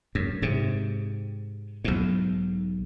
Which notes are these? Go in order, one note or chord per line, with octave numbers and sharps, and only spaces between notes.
F#2
G#2 C3
B1 G#2